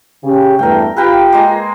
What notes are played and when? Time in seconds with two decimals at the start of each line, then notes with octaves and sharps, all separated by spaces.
0.24 C#3 G4
0.59 E2 G2 A3 A#4 G5
0.96 F4 G4 A#4 B4 G5
1.32 G#3 A#3